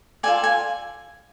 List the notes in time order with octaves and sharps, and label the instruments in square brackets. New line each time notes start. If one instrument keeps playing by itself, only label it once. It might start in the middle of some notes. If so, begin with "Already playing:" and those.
[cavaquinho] F4 A4 D5 G#5
G#5